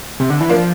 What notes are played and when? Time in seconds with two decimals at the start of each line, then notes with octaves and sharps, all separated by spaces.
0.20 C3
0.30 D3
0.40 E3
0.49 F3 A#3 D4